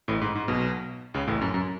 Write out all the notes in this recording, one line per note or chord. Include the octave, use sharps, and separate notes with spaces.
A1 A2
G#2
G#2
B1 B2
C#2 C#3
A1 A2
F#2
F#2